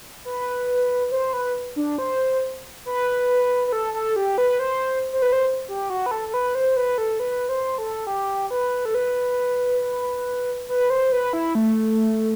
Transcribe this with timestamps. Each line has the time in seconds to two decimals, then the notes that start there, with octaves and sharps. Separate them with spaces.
0.25 B4
1.11 C5
1.33 B4
1.76 D4
1.98 C5
2.85 B4
3.67 B4
3.72 A4
3.94 A4
4.16 G4
4.38 B4
4.59 C5
5.13 C5
5.22 B4
5.32 C5
5.68 G4
5.90 F#4
6.06 B4
6.11 A4
6.28 A4
6.34 B4
6.55 C5
6.76 B4
6.98 A4
7.20 B4
7.49 C5
7.78 A4
8.07 G4
8.51 B4
8.85 A4
8.94 B4
10.68 B4
10.90 C5
11.12 B4
11.33 E4
11.55 A3